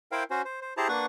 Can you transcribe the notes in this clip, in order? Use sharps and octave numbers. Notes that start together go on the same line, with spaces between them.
E4 A#4 C5 F5 G5
C#4 F#4 C5
C5
C5
E4 G4 G#4 C5 A5 A#5
A#3 D4 B4 F#5 C#6